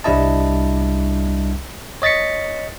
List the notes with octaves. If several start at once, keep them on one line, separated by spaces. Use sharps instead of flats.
C2 G3 D4 E4 D#5 A5
C#5 D#5 A6 B6 C#7